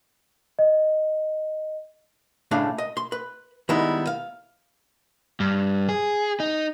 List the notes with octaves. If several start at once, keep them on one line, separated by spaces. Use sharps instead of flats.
D#5
C#2 A2 C#3 A3 D4 F5
D#5
C6
B4
D#3 G3 G#3 B3 D#4 E4
F5
G2
G#4
D#4